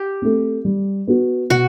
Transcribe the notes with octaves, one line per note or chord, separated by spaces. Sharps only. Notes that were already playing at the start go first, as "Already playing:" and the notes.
Already playing: G4
A3 C4
G3
B3 F#4
B2 F#4